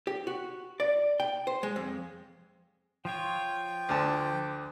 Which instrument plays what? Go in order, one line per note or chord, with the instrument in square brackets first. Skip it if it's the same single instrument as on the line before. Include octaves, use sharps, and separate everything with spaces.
[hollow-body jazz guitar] G4
F#4
D5
G5
C5
G#3
F2
[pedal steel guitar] F3 F4 C#5 [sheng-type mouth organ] G5
[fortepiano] D2 D3 A5